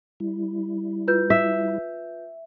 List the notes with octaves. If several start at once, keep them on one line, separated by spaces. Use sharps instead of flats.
G3 E4
F4 B4 G6
E5